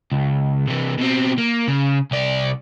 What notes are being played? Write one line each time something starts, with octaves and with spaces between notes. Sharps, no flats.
C#2
C3 E3
B2 C4
A#3
C#3
C2 D5